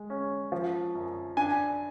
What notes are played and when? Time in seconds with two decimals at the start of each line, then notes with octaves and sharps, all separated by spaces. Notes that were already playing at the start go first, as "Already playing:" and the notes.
Already playing: G#3
0.10 C#4
0.52 F3
0.95 F#2
1.37 D4 G#5